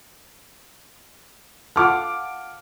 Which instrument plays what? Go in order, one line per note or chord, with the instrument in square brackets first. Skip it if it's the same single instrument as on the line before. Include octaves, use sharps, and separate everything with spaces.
[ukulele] F4 A4 [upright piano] F#5 D6 F6